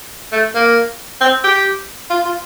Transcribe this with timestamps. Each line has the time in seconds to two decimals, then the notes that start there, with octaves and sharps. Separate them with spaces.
0.32 A3
0.54 A#3
1.21 C4
1.44 G4
2.10 F4
2.25 F4